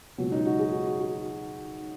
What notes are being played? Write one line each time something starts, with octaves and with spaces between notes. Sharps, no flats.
C#2 B2 F#3
D#4
F#4
G#4
F#4
F#4
F#4